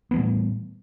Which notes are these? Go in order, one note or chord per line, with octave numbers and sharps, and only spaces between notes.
A2 E3 G3 B3